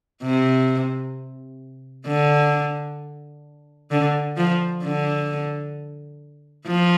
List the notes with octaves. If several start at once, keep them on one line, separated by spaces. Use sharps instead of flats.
C3
D3
D3
F3
D3
F3